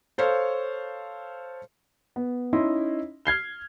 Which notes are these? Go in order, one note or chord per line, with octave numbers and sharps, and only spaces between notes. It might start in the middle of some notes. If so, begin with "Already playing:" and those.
A4 C5 C#5 F5
B3
C#4 D#4 E4 D#5 C6
F6 G#6 C7 G7